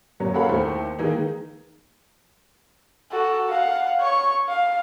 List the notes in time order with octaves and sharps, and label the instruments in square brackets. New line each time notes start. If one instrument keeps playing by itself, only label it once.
[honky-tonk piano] F#2 A#2 F#3 C#4
A4 A#4 C#5 F5 F#5 B5
D#2 D#3 A3 E4 C5
D#3 E3 G#3 A#3 D#4
[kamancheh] F#4 A4
F5 F#5
C#5 C#6
F5